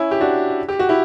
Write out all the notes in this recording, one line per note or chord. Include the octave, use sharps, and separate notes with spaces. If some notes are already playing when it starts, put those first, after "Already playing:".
Already playing: C#4 E4
G4
D4 F#4
G4
F#4
E4 G4